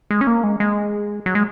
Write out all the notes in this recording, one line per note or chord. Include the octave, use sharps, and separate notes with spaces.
G#3
C#4
A#3
G#3
G#3
F#3
G#3